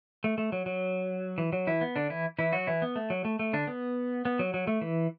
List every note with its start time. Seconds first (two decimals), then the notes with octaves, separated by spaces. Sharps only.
0.24 A3
0.38 A3
0.52 F#3
0.66 F#3
1.38 E3
1.53 F#3
1.67 E3 E4
1.81 B3
1.96 D3 D4
2.10 E3 E4
2.39 E3 E4
2.53 F#3 F#4
2.67 E3 E4
2.82 B3
2.96 A3
3.10 F#3
3.25 A3
3.39 A3
3.53 D3 D4
3.67 B3
4.25 B3
4.39 F#3
4.54 F#3
4.67 A3
4.81 E3